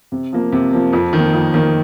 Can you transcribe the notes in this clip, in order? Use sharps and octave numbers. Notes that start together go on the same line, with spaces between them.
C3
F3 A#3
C3
F3 A#3
F2
D#3 A#3
F2
D#3 A#3